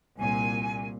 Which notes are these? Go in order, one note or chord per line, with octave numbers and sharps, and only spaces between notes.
C2 A#2 G#5